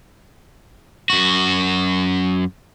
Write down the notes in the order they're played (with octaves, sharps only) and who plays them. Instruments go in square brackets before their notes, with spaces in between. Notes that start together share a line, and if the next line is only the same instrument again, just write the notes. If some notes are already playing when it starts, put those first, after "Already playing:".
[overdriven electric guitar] F#2 F#4